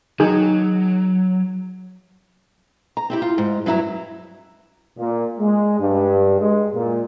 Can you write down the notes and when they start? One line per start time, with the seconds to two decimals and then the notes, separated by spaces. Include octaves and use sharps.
0.20 D#3 F#3 D#4 G#4
2.97 A#5
3.10 C4 E4 G4
3.22 F4
3.38 G#2
3.66 G2 F#3 E4 A#5
4.98 A#2
5.39 G#3
5.79 G2
6.40 G#3
6.73 A#2